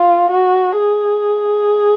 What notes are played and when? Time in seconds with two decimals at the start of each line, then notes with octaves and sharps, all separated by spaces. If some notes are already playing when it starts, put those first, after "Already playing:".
Already playing: F4
0.30 F#4
0.78 G#4